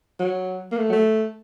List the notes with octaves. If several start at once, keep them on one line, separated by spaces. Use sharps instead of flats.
F#3
A#3
A3
F#3
A3